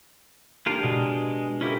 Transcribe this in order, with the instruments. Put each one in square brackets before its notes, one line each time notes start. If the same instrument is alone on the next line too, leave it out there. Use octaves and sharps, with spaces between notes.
[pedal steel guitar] A#3 F4 A#4 [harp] D4 G4
[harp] B2 [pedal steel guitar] G#3
[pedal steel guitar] C#4 E4 [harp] F4 G4 A#4